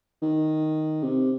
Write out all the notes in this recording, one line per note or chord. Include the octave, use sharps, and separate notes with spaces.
D#3
C3